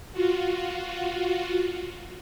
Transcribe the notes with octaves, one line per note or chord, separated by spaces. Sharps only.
F4 F#4